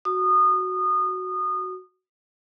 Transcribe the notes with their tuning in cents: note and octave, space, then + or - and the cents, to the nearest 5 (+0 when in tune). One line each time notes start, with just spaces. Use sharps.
F#4 +0 D#6 -25